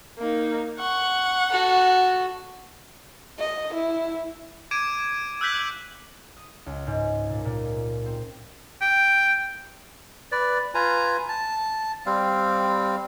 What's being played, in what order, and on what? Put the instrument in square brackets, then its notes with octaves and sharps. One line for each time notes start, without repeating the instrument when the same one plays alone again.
[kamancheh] A#3 D#4
[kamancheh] F#5 [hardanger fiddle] C#6
[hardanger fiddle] F#4 A4
[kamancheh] D#5
E4
[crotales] D6 G#6 D7 D#7
E6 F#6 G6 B6 F#7
[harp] D#6
C#2
G#2
A#2
A#2
C4
[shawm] G5
[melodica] B4 D5
F4 B4 G#5 A#5
A5
G3 C4 F5